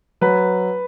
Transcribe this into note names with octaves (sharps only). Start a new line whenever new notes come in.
F#3 B4